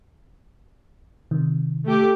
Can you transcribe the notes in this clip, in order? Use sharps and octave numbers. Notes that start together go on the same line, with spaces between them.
C3 D#3
A3 G4